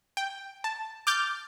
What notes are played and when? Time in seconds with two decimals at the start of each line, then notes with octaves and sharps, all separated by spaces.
0.17 G5
0.64 A5
1.07 D6 F6 G6 A6